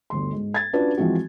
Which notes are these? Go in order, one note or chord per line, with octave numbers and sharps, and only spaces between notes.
G1 D2 C6
G#2
G#6 A6
C#4 D4 F4 F#4 B4 D5
E3 F3 G#3 C4 F#4